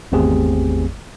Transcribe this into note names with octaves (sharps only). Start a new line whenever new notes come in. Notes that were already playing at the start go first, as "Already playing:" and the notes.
G#1 E2 A3 C4 G4 G#4